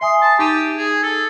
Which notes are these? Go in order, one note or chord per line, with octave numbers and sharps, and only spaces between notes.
E5 G#5 C6 D#6
A5
D#4 G4 D#7
G#4
A4